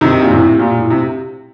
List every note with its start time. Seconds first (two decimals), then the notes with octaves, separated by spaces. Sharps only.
0.01 C3 D#3
0.22 A#2
0.31 A2 C3
0.59 A#2
0.78 A2
0.90 C3